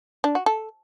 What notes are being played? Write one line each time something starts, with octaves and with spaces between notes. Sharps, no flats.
D4
F#4
A4